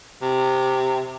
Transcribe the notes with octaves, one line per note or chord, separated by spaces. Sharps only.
C3